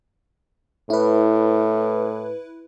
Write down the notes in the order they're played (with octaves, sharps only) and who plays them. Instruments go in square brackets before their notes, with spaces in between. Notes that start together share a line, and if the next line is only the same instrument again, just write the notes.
[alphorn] A2 [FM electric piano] E4 B4